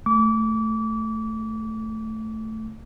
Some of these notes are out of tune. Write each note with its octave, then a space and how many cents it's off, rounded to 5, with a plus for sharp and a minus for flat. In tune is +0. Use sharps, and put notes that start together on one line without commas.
A3 +0 D6 -30